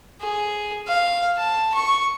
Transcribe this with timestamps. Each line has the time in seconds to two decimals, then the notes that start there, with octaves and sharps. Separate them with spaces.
0.21 G#4
0.88 F5
1.37 A5
1.74 C#6